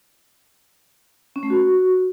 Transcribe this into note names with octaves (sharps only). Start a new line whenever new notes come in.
C#4
A3
F#4